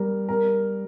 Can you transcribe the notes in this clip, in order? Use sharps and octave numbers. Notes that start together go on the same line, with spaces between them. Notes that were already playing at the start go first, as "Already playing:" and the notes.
Already playing: G3 A#4
A#4